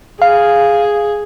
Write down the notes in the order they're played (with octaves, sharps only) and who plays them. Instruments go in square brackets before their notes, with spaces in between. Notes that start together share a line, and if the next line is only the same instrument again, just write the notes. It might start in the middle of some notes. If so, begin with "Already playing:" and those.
[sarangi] G#4 [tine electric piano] F5